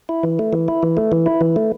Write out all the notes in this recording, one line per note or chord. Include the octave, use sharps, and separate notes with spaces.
E4
E3
A3
E3
E4
E3
A3
E3
E4
E3
A3